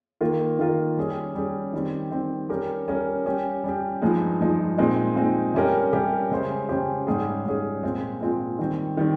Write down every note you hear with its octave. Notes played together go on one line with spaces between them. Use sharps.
D#3 A#3 F4 A#4
D#3 A#3 F4 A#4
G3 C#4 G#4
G3 C#4 G#4
D#3 G3 C4
D#3 G3 C4
G3 C#4 G4 A#4
G3 C#4 G4 A#4
G3 C#4 G4
G3 C#4 G4
G2 F3 G#3 D#4
G2 F3 G#3 D#4
A#2 G#3 C4 D#4
A#2 G#3 C4 D#4
C3 G3 C#4 G4 A#4
C3 G3 C#4 G4 A#4
C#3 G#3 C#4 G4 C5
C#3 G#3 C#4 G4 C5
G#2 G3 C#4 G#4
G#2 G3 C#4 G#4
A#2 G#3 C4 F4
A#2 G#3 C4 F4
D#3 G3 C4
D#3 G3 C4